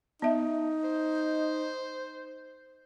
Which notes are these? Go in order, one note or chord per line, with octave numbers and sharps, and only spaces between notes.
B3 D#4 E5
C5